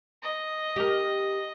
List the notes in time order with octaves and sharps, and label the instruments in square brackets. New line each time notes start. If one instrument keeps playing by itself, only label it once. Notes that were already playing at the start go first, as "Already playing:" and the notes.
[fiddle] D#5
[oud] G4 A#4